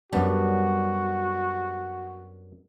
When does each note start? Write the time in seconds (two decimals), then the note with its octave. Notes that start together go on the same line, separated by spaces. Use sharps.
0.13 F#2 G3 B3 D4 F#4